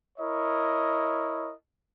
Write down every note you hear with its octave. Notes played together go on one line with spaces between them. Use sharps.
E4 A#4 C#5 D#5